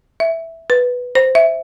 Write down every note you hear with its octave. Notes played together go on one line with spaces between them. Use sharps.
E5
B4
C5
E5